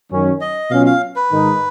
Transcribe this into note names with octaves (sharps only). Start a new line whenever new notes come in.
F#2 D#3 F#3 C#4
D#5
B2 F#3 C#4 F4 F5
F5
B4
G#2 D#3 G#3 D#4